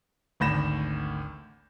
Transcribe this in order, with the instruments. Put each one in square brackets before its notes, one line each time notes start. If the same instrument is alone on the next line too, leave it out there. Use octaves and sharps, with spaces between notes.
[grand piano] G#1 D2 B5 G6 A#6 E7